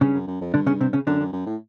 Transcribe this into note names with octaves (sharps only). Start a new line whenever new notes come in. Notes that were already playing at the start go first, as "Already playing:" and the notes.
G2 C#3 C#4
F#2
F#2
F2
G2 D3 D4
C#3 C#4
C3 C4
C#3 C#4
F#2 D3 D4
F#2
F#2
A2